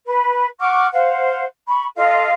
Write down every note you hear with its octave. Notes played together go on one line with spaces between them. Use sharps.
B4
F#5 C#6 D6 F6
C5 F5 F#5
B5 C#6
F4 A4 D#5 F5